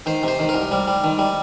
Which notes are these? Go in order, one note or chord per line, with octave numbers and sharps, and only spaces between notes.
D#3 C5
C3 C5
D#3
A#4
C2
G3
G3
D#3
G3